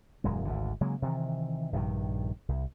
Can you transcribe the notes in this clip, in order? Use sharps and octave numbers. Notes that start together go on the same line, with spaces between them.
D#1 F#2 G#3
G#1 D2 D3
C#3 F#3 G#3 A#3
C3 D#3 E3
A#1 G2 C3 D#3
C2